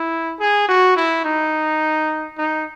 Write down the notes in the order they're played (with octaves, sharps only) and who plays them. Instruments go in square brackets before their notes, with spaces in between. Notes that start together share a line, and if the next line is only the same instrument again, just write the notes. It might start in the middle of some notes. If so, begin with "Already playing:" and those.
Already playing: [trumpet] E4
G#4
F#4
E4
D#4
D#4